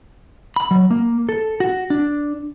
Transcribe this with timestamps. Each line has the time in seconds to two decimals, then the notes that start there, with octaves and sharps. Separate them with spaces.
0.56 B5
0.71 F#3
0.91 A#3
1.29 A4
1.60 F#4
1.90 D4